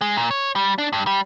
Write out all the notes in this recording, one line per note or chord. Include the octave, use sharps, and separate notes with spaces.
G#3
A#2
C#5
G3
D4
G2
G3